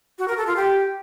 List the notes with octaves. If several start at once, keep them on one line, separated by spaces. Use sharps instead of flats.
F#4
A#4
A4
F4
G4